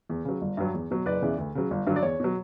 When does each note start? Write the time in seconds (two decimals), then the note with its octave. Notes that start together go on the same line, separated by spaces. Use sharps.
0.10 E2
0.25 C#3 F#3
0.42 G1
0.57 G2 F#3
0.74 E2
0.91 B2 F#3
1.06 F#1 B4 D5
1.22 E2 C#3 E3
1.38 D2
1.55 C#3 F#3
1.71 G1
1.87 G2 D3 F#3
1.96 D5
2.03 E2 C#5
2.20 B2 F#3